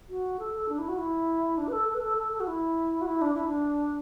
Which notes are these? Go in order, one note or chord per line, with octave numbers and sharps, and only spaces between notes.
F#4
A4
A4
D4
E4
F#4
E4
D4
B4
A4
A4
B4
A4
A4
A4
F#4
E4
F#4
E4
D4
E4
D4